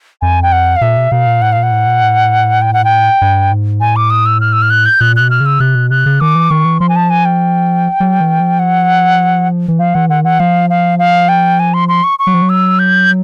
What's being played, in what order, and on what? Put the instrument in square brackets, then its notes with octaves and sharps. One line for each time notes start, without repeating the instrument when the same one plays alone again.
[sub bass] F2 [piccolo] G#5
[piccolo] G5
F#5
F5
[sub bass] A#2 [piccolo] E5
[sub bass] B2
[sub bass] B2 [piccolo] F5
[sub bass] A#2
[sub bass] A2 [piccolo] F#5
[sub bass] A#2 [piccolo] F5
[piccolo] F#5
[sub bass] A2
A#2
A2
[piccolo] G5
F#5
G5
[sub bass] G2
G#2
[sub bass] A2 [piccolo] G#5
[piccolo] D6
D#6
E6
F6
E6
F6
F#6
G6
[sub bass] A#2 [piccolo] F#6
[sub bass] B2 [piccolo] F#6
[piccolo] F6
[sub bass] C#3
[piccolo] E6
[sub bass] C3 [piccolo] F#6
[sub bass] B2
[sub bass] C3 [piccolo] F#6
[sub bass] C#3
[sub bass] D#3 [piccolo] D6
[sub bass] E3
[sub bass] D#3 [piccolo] C#6
[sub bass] E3
[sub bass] F3 [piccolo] C6
[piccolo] G#5
A5
G#5
G5
[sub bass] F#3
E3
F3
[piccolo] F#5
[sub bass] E3
[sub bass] F3 [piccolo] F5
[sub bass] E3 [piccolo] F#5
[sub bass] D#3 [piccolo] F#5
[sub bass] E3 [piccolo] F#5
[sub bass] F3 [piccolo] F5
[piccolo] F5
F5
G5
G#5
C6
C6
C#6
C#6
[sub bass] F#3
F3
F#3
[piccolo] E6
G6